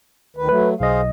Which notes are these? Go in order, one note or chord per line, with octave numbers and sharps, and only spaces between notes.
D2 D#3 B4
F#3 A3 B4
B1 G#4 C5 D#5 F5